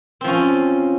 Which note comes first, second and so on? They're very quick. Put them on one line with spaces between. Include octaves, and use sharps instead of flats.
C4 F3 C#4